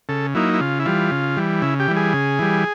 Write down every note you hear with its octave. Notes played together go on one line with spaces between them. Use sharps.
C#3 A4
F#3 A#3 D#4 E4
E4
C#3 F4
E4
E3 G3 F4
C#3
E3 G3
C#3 E4
G4
E3 G3
G#4
C#3
E3 G3